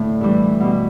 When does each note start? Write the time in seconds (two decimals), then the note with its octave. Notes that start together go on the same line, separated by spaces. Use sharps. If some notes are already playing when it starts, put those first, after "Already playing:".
Already playing: A2 D3 A3
0.21 G2 E3 G3
0.60 B2 G3